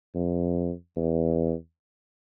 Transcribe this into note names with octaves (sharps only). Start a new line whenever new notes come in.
F2
E2